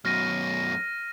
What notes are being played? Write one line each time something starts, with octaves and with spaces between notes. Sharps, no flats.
F#2 B2 F6 A#6 D#7